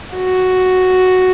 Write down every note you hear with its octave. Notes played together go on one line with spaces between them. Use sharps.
F#4